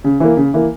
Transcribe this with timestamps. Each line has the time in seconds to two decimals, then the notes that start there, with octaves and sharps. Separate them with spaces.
0.04 C#3
0.20 E3 A#3
0.37 C#3
0.54 E3 A#3